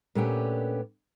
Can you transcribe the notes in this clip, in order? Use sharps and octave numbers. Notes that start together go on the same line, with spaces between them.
A#2 A3 B3 C#4 D4 G4